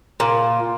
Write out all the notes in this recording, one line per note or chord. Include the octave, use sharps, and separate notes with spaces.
A#2